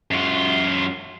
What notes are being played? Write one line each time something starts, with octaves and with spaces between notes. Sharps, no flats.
F#2 F4